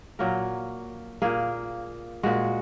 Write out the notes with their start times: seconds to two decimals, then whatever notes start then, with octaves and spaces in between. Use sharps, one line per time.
0.19 A#2 F#3 A#3 A#4
1.22 A#2 A#3 G#4
2.23 A#2 G#3 F#4